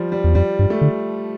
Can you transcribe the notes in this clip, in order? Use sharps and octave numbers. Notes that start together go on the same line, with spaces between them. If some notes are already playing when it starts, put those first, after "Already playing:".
Already playing: F3 G3
G3
E2
F2 G3
G2
A3
D3